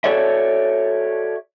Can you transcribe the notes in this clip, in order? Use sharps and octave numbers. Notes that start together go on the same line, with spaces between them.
F#4 A4 C#5 D5 E5